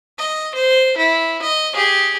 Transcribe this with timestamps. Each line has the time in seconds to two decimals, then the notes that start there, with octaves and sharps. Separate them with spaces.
0.18 D#5
0.55 C5
0.97 E4
1.42 D#5
1.74 G4 G#4